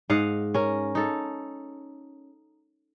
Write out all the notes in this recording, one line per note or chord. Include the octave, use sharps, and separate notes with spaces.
G#2 D#5 F5 F#5
C#4 A#4
D#4 A4